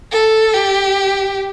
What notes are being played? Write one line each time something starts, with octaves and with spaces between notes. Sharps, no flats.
A4
G4